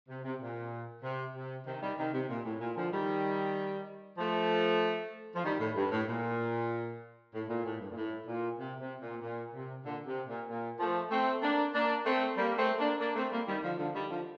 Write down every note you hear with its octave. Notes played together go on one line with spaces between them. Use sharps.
C3
C3
A#2
C3
C3
C3 D#3
D#3 G3
C3 D#3
C3
A#2
A2
A#2
D3 F3
D#3 G3
F3 A3
F3
D#3 G3
A2
G2
A2
A#2
A2
A#2
A2
G2
A#2
A2
A#2
C3
C3
A#2
A#2
C3
A#2 D3
C3
A#2
A#2
F3 A3
A3 C4
A#3 D4
A#3 D4
A3 C4
G3 A#3
A3 C4
A#3 D4
A#3 D4
A3 C4
G3 A#3
D#3 G3
D3 F3
D3 F3
D#3 G3
D3 F3